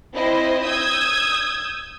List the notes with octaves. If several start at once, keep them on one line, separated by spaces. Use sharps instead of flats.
C4 E4 C5 D#5
D#6 E6 G6 G#6